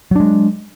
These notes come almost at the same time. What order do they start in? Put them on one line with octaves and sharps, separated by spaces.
F#3 D4 G#3